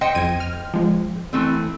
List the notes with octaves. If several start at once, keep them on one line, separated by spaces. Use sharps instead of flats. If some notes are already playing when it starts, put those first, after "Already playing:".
C5 D#5 G5 C6 C#7
F2 G#6 D#7
F6
F3 G#3
E3 A3 C4